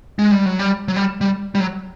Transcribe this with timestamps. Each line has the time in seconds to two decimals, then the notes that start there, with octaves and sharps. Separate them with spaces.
0.19 G#3
0.31 G3
0.46 F#3
0.59 G3
0.88 F#3
0.96 G3
1.21 G3
1.55 G3
1.60 F#3